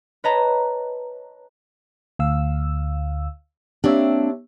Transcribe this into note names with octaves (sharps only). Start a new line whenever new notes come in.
B4 C#5 D#5 A5 A#5
D2 F5 E6
A#3 C4 D4 G4 C#5 E5